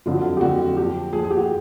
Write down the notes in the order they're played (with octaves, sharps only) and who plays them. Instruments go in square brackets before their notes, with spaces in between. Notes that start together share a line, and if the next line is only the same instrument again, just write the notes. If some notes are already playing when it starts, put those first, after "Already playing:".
[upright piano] F2 D3 F#3 F4
F#4
F4
G4
F2 D3 F#3 F#4
A#2 F3 G4
A#2 F3 G#4
G#4
G4
F#4